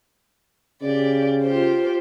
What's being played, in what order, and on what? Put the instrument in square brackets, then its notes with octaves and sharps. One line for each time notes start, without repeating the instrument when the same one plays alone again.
[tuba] C#3 [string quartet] G4 D5
[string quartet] F4 G4 C5